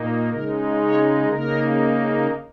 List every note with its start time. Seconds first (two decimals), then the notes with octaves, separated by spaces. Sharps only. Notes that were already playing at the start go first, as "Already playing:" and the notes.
Already playing: A#2 A#3 D#4
0.29 C#3 G#3 D#4 A#4
0.80 C#5
1.30 C#3 A#3 D#4 A#4